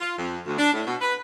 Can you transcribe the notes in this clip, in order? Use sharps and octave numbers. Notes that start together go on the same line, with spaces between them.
F4
F2
D2
D4
A2
B2
B4